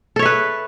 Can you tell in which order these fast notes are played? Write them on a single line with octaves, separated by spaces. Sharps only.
A4 C#5 E5 B4